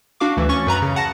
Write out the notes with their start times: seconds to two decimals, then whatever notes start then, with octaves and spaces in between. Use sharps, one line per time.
0.20 D4 F#4 F5 D6
0.37 D2 E3
0.49 C#4 C#6 A6
0.67 F#2 B4 A#5 B5
0.82 C#3
0.96 F#5 A5 A#6